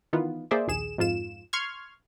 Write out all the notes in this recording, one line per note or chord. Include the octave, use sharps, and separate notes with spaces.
D#3 E3 B3 F4
A#3 G#4 C5 D5 E5
A#1 D#2 G#4 E7
F2 G#2 F4 E7
C6 C#6 F6 G#6